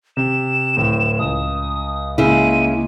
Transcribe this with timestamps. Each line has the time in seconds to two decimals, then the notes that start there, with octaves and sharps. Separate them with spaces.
0.17 C3 E7
0.77 D1 A2
1.19 C#2 D#6
2.18 C#3 G#3 A#3 E4 D#7